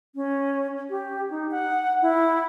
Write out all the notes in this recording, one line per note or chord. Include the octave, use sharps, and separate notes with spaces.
C#4
G4
D#4
F#5
E4